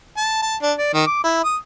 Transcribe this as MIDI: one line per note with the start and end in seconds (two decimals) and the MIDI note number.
0.17 0.40 81
0.42 0.55 81
0.63 0.73 62
0.78 0.89 74
0.93 1.01 51
1.06 1.23 86
1.24 1.42 64
1.44 1.57 87